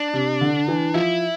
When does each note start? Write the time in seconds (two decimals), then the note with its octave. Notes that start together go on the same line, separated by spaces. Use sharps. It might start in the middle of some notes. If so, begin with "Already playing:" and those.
Already playing: D4
0.14 C3
0.41 D3
0.68 E3
0.94 F3 E4